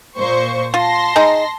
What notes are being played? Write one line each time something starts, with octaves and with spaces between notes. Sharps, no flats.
A#2 C5 C#6
F4 A5 C6 A#6
D#4 G#4 A#5